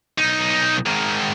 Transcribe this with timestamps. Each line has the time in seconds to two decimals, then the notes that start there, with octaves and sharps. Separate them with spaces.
0.18 B1 D#4
0.86 G#2 D#3